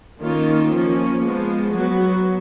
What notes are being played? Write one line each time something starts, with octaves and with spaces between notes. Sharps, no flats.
D#3 A#3 C#4 F4
F3 A#3 C#4
F3 G#3 B3
F#3 B3 F#4